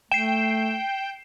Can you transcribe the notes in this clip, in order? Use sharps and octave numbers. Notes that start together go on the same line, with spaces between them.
A3 G5 C7 E7